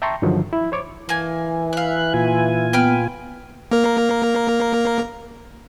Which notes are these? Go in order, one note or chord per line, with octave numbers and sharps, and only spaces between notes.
E5 G5 A5 A#5 C6 C#6
G2 D3 D#3 F3 F#3
E4
C5 C#5 D6
E3 A#3 G#5
E5 F5 F#6
A#2 F4 G#5
B3 B4 G5 F6
A#3 A#4